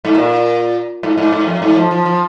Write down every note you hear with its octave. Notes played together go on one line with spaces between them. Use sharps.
G#2
A#2
G#2
G#2
G#2
F2
G#2
F3
F3
F3